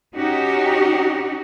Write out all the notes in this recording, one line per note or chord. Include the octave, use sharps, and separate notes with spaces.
C#4 D#4 F#4 G4